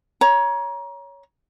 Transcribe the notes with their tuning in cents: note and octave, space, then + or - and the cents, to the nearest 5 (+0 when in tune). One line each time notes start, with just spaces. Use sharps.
C#5 +10 A#5 +30